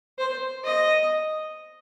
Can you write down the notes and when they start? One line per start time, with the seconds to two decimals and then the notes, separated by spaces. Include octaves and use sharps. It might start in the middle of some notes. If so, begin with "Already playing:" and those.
0.19 C5
0.64 D#5